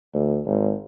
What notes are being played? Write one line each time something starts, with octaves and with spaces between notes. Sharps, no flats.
D2
G#1